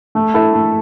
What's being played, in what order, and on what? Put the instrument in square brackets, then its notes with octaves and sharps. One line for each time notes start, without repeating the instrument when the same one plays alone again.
[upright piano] A3
E4 A4
A3